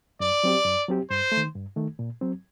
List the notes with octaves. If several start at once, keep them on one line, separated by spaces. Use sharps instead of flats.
F#2 D5
F#3 C4 G4
F#2
F#3 C4 G4
G2 C5
A3
D#3
G2
D#3 A3
A#2
F#3 C4